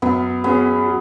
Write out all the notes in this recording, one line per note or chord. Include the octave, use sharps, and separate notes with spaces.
F#2 B3
F#3 B3 C#4 G#4
F#3